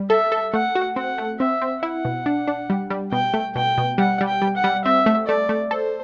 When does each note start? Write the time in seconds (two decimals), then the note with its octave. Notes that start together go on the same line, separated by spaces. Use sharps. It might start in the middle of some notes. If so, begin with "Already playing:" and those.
Already playing: G3
0.10 A4 E5
0.32 A4
0.54 A3 F#5
0.75 F#4
0.96 C4 F#5
1.18 A3
1.40 C4 E5
1.62 C4
1.83 E4 F#5
2.05 B2
2.26 D4
2.48 D4
2.70 G3
2.90 G3
3.12 B2 G5
3.34 A3
3.56 B2 G5
3.78 B2
3.98 G3 F#5
4.21 G3
4.28 G5
4.42 G3
4.57 F#5
4.64 G3
4.85 C4 E5
5.06 A3
5.28 A3 D5
5.49 A3
5.71 A4 C5